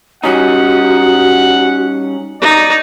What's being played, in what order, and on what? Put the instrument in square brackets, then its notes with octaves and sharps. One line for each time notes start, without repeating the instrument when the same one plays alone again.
[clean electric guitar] G3 C#4 D#4 [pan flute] F#4 [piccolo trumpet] F#5
[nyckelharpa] D#4 [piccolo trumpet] D5